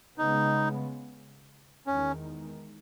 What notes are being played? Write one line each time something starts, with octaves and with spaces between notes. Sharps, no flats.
C#3 G#3 B3 D#4
E2 D#3 G#3 C#4